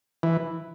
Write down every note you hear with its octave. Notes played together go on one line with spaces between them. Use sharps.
E3